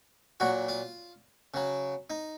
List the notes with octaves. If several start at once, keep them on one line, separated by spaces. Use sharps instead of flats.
A#2 F#3 F#4
F4
C#3 F#3
D#4